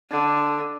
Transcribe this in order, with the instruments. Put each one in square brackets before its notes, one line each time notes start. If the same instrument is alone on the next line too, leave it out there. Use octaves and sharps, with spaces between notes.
[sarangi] D3